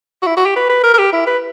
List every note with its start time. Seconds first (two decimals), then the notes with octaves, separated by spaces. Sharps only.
0.22 F#4
0.26 E4
0.37 F#4
0.46 G4
0.56 B4
0.69 B4
0.83 A#4
0.94 A#4
0.98 G4
1.13 E4
1.27 B4